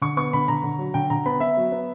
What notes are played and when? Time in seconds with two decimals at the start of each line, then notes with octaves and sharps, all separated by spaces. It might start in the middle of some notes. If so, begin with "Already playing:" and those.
0.02 D3 C#6
0.17 B3 C#6
0.33 D3 B5
0.48 D3 A#5
0.63 D3
0.79 F#3
0.94 D3 G5
1.10 D3 A#5
1.26 B3 B5
1.40 B3 E5
1.57 F#3
1.72 B3